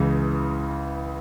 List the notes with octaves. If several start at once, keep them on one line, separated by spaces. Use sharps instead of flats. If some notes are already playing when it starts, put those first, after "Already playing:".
Already playing: C#2 C#3 E3